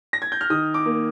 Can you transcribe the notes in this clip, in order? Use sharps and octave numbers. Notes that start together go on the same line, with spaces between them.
A#6
G#6
G6
F6
D#3 D#6
D6
A#3